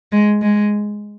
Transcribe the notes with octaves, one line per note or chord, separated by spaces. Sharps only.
G#3
G#3